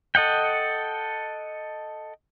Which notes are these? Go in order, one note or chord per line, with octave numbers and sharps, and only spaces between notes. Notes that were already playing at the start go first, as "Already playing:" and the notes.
A4 D#5 F#5 G5